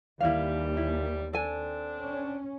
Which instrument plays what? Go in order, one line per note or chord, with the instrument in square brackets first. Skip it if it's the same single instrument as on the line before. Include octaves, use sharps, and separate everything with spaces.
[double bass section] D#2 [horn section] E3 G3 [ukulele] E4 F5
[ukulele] E4
[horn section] C4 D4 [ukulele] A4 G#5
[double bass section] C#4